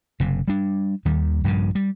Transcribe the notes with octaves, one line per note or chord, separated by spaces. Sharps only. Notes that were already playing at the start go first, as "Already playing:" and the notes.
F#1 C3
G3 D4
D#2 D#3 G3
A#1 G2 A#2 C#3
G3